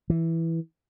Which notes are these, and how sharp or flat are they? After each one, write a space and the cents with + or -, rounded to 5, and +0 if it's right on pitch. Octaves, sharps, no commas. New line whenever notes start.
E3 -5